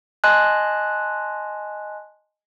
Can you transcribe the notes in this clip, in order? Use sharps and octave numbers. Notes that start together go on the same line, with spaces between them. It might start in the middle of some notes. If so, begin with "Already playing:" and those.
D#5 G#5 A5 C6 F#6